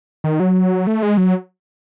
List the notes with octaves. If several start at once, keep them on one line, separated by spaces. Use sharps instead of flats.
D#3
F#3
A3
G#3
F#3